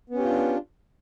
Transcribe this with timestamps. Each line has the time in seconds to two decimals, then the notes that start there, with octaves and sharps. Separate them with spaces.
0.10 B3
0.14 C#4
0.19 G4
0.23 F4
0.28 D4